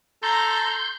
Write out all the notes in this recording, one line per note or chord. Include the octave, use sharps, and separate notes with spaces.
A4 A#5 C6 G6